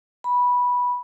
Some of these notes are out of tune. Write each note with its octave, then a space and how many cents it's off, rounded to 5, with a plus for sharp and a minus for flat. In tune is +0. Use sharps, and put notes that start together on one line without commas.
B5 -10